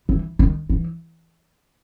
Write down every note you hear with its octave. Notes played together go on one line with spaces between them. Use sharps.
E3
D#3
E3